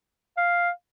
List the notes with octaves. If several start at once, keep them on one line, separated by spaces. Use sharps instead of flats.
F5